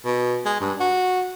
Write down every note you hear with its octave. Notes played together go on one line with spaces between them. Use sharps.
B2
G#3
G2
F#4